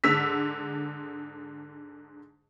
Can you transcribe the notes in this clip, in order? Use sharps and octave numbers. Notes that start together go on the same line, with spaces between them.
G#2 D3 E6 B6